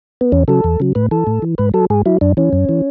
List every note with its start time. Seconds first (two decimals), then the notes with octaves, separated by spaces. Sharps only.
0.21 B3
0.32 E2 C#4
0.48 C#3 F#3 A4
0.64 E2
0.80 C#3 F#3
0.95 A2 B4
1.11 E3 A4
1.27 A2
1.42 E3
1.58 G#2 B4
1.74 F#3 A4
1.90 G#2 G#4
2.06 F#3 E4
2.21 F#2 D4
2.37 E3 C#4
2.53 F#2
2.69 E3